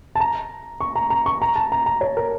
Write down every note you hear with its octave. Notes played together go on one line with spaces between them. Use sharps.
A5
A#5
C#6
A#5
A#5
C#6
A#5
A5
A#5
A#5
C#5
A#4